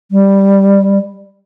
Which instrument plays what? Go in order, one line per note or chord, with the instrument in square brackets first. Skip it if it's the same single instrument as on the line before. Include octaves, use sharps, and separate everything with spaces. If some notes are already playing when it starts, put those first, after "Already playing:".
[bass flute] G3